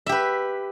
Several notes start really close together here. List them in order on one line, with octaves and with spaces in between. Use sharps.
E5 G4 B4